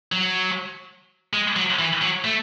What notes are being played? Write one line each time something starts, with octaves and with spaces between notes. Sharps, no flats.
F#3
G#3
F#3
E3
F#3
A3